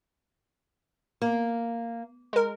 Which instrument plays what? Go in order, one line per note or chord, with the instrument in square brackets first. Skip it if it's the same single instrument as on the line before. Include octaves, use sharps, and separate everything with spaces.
[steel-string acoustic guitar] A#3
[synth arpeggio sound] G#3 A#4